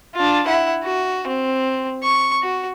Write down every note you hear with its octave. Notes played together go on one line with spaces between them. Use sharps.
D4 F4
E4 F#5
F#4
C4
C#6
F#4